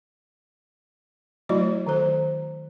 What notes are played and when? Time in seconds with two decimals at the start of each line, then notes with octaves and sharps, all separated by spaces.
1.49 F#3 A3 E4 F#4 D5 D#5
1.87 D#3 A4 C5